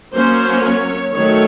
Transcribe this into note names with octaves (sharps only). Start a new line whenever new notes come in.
F#3 A#3 C#4 C5
C#5
D#3 F#3 A3 C#5